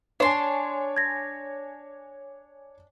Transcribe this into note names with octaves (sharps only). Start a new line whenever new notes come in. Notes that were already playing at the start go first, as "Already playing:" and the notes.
D4 C#5 G#5 C6
G#6 A#6